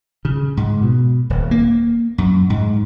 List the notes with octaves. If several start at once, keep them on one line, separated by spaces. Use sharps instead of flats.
C#3
G#2
B2
D#1
A#3
F#2
G#2